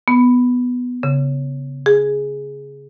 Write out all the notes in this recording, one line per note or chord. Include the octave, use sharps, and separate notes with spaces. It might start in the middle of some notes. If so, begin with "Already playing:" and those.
B3
C#3
G#4